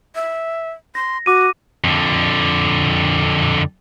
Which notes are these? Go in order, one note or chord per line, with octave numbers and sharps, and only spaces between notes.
E5
C6 A#6
F#4 D6 D#7
F2 D3